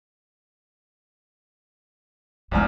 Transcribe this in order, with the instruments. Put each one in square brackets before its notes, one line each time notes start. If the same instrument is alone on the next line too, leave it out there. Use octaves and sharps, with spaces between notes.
[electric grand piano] A#1 E2 F6 [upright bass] A#2 G#3